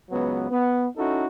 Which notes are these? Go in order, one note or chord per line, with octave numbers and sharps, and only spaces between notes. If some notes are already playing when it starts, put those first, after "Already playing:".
C#2 F#3 B3
B3
C#4 D#4 E4 F#4 A4